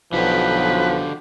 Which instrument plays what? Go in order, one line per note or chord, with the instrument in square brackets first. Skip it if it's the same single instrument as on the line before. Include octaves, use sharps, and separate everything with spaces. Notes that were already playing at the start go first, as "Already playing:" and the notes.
[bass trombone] B1 [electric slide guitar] D3 F#4 G4 [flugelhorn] F3 [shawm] B4